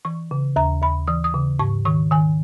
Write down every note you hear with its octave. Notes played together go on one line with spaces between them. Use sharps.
E3 C#6
C#3
D#2 A#5
D#2 B5
E3 D#6
D#6
C#3
G#2 C#6
D#3 C#6
D#3 G#5